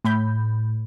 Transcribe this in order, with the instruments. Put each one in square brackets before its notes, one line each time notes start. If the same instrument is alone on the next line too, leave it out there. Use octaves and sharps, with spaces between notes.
[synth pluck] A2 B5 G6